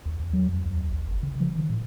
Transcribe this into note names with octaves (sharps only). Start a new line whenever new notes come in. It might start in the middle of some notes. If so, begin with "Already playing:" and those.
D#2
E2
F#3
F2
D#2
A1
G1
C#3
F3
D#3
A2